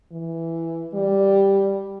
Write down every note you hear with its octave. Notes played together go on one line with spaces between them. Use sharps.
E3
G3